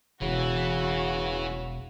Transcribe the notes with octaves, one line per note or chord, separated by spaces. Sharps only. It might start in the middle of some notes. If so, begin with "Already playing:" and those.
E1 C#3 E3 F#4